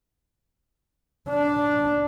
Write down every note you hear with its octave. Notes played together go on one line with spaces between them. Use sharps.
D4